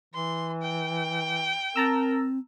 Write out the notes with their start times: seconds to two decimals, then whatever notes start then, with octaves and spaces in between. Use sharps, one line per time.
0.14 E3 C6
0.62 G5
1.76 C4 A#4 A5 A#5 E6